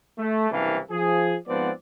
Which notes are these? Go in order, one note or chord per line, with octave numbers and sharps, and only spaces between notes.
A3
F#1 C2 C3 E3 D4 F5
F3 G#4
G#2 F3 B3 C4 D5 F#5